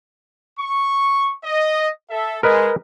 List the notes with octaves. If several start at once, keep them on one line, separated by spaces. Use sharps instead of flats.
C#6
D#5
A4 E5
G#3 A#4 B4 D#5